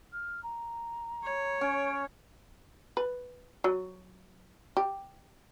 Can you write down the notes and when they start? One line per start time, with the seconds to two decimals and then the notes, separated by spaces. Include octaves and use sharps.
0.12 F6
0.43 A#5
1.23 C#5
1.61 C#4 D7
2.97 B4
3.64 F#3
4.77 G4